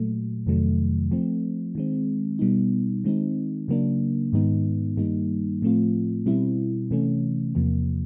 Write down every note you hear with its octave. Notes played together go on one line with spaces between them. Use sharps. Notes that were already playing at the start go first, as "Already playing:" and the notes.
Already playing: A#2 F#3 A3
F2 C3 D#3 F#3 A3
F3 A3 C4
D#3 G#3 C4
B2 G3 B3 D#4
D#3 G#3 C4 D#4
C#3 F#3 A#3 D4
G#2 D#3 G#3 B3 D#4
G2 D#3 G3 A#3 D#4
A2 F3 A3 C4 F4
B2 G3 C4 E4
C3 E3 A3 C#4
E2 C3 F3 A#3